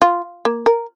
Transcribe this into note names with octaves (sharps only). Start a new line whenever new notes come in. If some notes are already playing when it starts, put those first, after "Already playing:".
F4
A#3
A#4